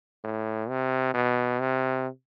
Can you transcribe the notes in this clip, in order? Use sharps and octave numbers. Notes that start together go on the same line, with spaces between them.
A2
C3
B2
C3